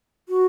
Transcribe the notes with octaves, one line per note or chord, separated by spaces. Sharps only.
F#4